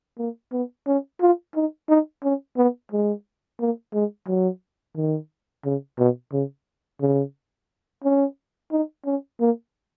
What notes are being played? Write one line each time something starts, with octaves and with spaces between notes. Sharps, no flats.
A#3
B3
C#4
F4
D#4
D#4
C#4
B3
G#3
A#3
G#3
F#3
D#3
C#3
B2
C#3
C#3
C#4
D#4
C#4
A#3